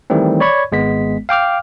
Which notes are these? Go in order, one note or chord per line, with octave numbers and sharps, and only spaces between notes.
D#3 E3 G3 A3 C4
C#5 D5 B5 C#6 G#6
G#1 G#3 B3 B6
F5 G5 D6 F6